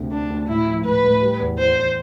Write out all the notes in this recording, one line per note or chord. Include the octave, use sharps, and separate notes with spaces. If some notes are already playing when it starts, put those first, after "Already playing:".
Already playing: D2 C3 C4
D2 D4
D2
A2 E4
F3
A2 B4
A2
G3
E2
E2 C5
E2